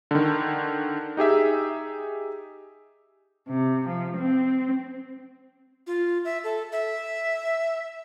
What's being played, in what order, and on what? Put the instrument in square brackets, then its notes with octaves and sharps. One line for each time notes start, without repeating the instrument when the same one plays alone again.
[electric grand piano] D3 D#3
D#4 G4 G#4 E5
[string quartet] C3
F3
C4
[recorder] F4
E5
A4
E5